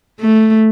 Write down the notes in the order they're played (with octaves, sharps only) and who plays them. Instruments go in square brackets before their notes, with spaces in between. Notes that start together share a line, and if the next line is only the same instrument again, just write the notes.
[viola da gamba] A3